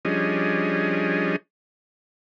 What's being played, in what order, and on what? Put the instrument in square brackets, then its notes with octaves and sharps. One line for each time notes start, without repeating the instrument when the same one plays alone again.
[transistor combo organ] F3 G3 C#4 D4 G#4 D#5